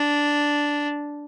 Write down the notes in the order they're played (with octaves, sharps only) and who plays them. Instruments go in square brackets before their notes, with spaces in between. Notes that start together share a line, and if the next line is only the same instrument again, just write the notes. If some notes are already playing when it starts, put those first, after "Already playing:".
Already playing: [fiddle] D4